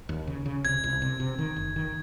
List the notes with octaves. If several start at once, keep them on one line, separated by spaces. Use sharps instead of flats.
D#2
C#3
C#3
C2 G#6
C2
C3
C3
D#3
F#1
D#3